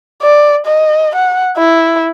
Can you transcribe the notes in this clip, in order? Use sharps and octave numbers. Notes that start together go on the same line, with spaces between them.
D5
D#5
F#5
E4